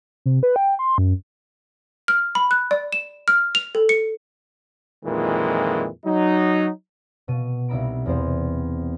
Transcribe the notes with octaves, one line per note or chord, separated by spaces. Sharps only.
C3
B4
G5
C6
F#2
F6
B5
F#6
D5
E7
F6
F7
A4
C#7
F2 A#2 D#3 E3 G#3
F#3 D#4
B2 D#7
C2 D#4 E5 A#5 B5 D7
E2 B3 C4 C5